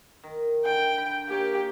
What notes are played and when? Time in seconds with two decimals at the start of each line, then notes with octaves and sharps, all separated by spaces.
0.23 D#3
0.65 D3 G5
0.98 B5
1.29 A#3 G4 C#5